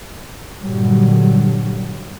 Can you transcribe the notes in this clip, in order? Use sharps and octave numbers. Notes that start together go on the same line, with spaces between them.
G2 A#2 D3 F#3 G3